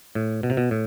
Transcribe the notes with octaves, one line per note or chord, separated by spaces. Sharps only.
A2
B2
C3
B2
A2